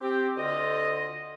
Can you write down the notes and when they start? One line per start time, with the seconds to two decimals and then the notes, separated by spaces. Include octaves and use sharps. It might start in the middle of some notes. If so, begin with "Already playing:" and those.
0.01 C4 G4
0.36 D2 D3 F4 D#5